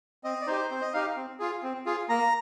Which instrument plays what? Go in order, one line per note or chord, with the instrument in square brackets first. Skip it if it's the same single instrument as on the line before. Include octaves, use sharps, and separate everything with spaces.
[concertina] C4 D#5
D5
D#4 G4 C5
C4 C5
D#5
D#4 G4 F5
C4
F4 G#4
C4
F4 G#4
A#3 A#5